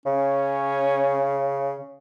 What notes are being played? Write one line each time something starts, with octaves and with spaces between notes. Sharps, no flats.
C#3 C#4